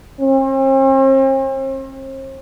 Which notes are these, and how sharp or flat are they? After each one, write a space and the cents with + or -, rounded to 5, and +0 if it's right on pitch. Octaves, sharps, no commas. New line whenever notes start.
C4 +45